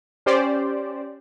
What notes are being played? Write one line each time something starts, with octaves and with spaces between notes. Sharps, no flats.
C#4 G4 C5 D5